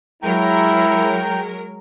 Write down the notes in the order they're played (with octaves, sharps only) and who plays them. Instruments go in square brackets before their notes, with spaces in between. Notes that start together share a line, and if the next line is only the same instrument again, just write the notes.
[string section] F#3 G#3 A#4 [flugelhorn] E4 [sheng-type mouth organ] G5 A#5